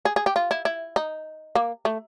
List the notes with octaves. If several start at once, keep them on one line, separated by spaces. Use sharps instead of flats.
G#4
G#4
G4
F4
E4
E4
D#4
A#3
A3